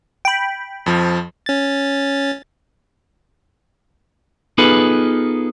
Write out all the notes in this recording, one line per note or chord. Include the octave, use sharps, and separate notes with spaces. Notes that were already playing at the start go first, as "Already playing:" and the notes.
G5 B5
F2 F3
C#4 A6
B3 D#4 F4 G#4 A4 B4